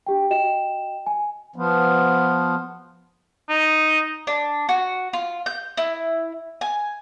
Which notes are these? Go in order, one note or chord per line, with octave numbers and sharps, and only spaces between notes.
D4 G4 G5
F#4 D#5 G5 E7
G#5
F3 B3
D#4
D4
F#4
F4
G6
E4
G#5